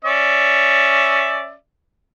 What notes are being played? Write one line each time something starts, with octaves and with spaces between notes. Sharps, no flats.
C#4 D5 E5